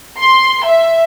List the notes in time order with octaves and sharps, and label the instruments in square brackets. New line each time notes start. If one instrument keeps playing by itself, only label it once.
[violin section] C6
E5